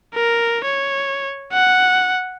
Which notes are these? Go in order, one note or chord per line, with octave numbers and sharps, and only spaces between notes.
A#4
C#5
F#5